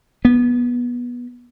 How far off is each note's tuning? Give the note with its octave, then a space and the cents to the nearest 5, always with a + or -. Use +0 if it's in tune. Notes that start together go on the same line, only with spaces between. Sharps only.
B3 -20